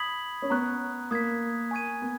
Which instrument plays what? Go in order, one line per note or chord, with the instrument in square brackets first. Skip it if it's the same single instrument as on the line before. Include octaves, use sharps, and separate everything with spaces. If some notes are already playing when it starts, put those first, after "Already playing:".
Already playing: [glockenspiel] B5 D#6 G#6 B6 F#7
[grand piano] C#4
[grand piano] B3 [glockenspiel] A#5 C#6 F#6
[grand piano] A#3 [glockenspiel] D#6 G#6 B6
[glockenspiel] G#5 C#6 G#6 D#7
[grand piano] B3